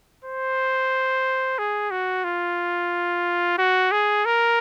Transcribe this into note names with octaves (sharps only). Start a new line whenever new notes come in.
C5
G#4
F#4
F4
F#4
G#4
A#4